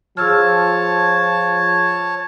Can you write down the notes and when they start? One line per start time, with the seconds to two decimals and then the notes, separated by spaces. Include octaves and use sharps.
0.17 F3 G#4 C#5 A5 E6 F6